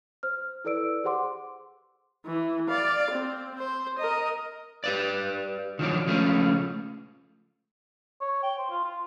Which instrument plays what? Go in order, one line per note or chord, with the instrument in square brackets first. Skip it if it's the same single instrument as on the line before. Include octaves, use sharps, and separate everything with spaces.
[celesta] C5 F6
E4 A4 B4 D5 E6 D7
G4 G#4 C5 F#5 C6 D6
[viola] E3
D5 F5
C4
C5
A#4 D#5
[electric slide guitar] G4 B4 D5
D#3 F3 F#3 D4
C#3 F3 G#3 A3 C4 C#4
[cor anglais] C#5
G5
C5
F4
F4